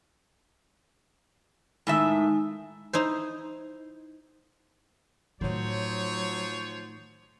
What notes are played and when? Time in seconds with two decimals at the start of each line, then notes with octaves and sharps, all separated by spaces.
1.87 A2 D#3 G#3 D#4 E5
2.93 D#4 E4 C5
5.41 A2 D#3 F3 F#3 C5 C#5